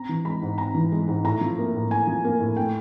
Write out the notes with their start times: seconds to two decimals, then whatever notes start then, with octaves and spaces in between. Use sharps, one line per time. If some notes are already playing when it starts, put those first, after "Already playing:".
Already playing: C4 A#5
0.09 E3
0.25 G#3 B5
0.42 G#2
0.58 C4 A#5
0.74 E3
0.92 G#3
1.08 G#2
1.24 A2 A#5
1.41 F3
1.58 A#3
1.74 A2
1.91 A2 G#5
2.07 F3
2.24 A#3
2.40 A2
2.56 A3 G5